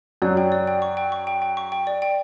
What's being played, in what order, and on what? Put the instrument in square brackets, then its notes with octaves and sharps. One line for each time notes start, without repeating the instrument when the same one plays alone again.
[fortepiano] F#2 F#3 [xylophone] D5
[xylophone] G5
D5
G5
C#6
G5
C#6
G5
G5
C#6
G5
D5
G5